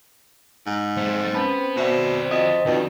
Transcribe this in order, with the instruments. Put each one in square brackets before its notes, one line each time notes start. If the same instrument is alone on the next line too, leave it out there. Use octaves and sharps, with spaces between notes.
[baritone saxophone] G#2
[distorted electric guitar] G#3 A3 [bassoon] C4
[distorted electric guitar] B3 B4 [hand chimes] C#4 A5 B5
[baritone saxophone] B2 [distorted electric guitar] F#4 D5 [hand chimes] C5 E5
[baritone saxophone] F2 [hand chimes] D#5 D#6 B6
[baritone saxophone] F2 [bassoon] B2 [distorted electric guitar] D#3 [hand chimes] C#4 D5